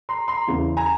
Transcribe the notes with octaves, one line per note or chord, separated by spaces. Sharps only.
A#5 C6
A#5 C6
E2 C#3 E3
G#5 A#5